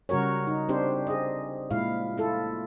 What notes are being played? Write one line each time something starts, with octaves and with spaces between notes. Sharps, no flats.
C#3 G3 F#4 A#4 C#5
D#4
C4 D4 G4 C5
G#4 D#5
A#2 G#3 E4 F5
E4 F4 A4